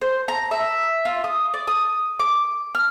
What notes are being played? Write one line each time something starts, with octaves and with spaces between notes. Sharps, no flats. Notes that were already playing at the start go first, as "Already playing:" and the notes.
C5
A#5
E5
F4
D#6
D5
D#6
D6
F6